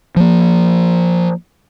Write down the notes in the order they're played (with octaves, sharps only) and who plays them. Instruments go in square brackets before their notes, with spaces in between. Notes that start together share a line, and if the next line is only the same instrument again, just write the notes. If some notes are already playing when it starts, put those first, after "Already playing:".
[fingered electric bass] F3 A#3